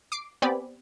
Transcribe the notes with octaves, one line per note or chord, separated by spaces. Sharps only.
D6 C7 D7
B3 C4 G4 D5 G#5 B5